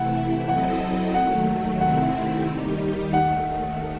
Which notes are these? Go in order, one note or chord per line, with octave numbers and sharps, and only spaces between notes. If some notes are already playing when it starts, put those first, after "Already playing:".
Already playing: C3 E3 A3 E4 F#5
F#3 C4 E4 A4 D#5 F#5
D#2 D#3 F#3 A3 F#5
C3 D#3 A3 C4 E4 F#5
D#2 D#3 G3 D#4 G4
D#2 D#3 A3 F#5